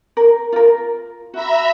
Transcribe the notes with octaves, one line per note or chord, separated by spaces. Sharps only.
A#4
F4 A#4
F#4 E5 A#5 B5